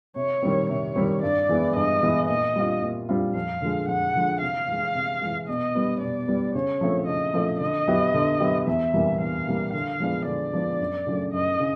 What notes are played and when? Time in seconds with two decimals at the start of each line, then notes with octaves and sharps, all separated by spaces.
0.16 C3 C#5
0.42 D#3 G3 C4
0.69 C3 C#5
0.96 D#3 G3 C4
1.23 G2 D5
1.49 E3 G#3 B3
1.75 G2 D#5
2.03 E3 G#3 B3
2.28 A#2 D#5
2.56 G3 C4 F4
2.82 A#2
3.09 G3 C4 F4
3.35 F2 F5
3.62 D3 F3 G#3
3.88 F2 F#5
4.15 D3 F3 G#3
4.41 C3 F5
4.68 E3 G#3
4.95 C3
5.22 E3 G#3
5.49 B2 D#5
5.75 G3 B3
6.01 B2 D5
6.28 G3 B3
6.55 C#3 C#5
6.81 F3 A3 C4
7.07 C#3 D#5
7.34 F3 A3 C4
7.60 D3 D#5
7.88 F#3 B3 E4 G4
8.14 D3
8.40 F#3 B3 E4 G4
8.67 E2 E5
8.94 C3 E3 G3 A#3
9.20 E2 F5
9.47 C3 E3 G3 A#3
9.73 D3 F5
10.00 F3 G#3 B3 D4
10.26 D3 D5
10.54 F3 G#3 B3 D4
10.80 F#2
11.07 C#3 F#3 A3
11.33 F#2 D#5
11.60 C#3